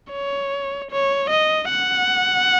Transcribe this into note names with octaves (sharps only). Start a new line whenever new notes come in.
C#5
C#5
D#5
F#5